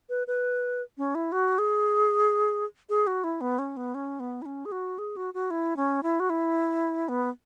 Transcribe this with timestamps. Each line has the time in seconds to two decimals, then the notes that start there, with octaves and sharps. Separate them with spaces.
0.09 B4
0.27 B4
0.98 C#4
1.15 E4
1.32 F#4
1.58 G#4
2.89 G#4
3.07 F#4
3.24 E4
3.41 B3
3.59 C#4
3.77 B3
3.94 C#4
4.20 B3
4.42 E4
4.46 C#4
4.65 G#4
4.72 F#4
4.98 G#4
5.16 F#4
5.34 F#4
5.50 E4
5.76 C#4
6.03 E4
6.20 F#4
6.30 E4
7.08 B3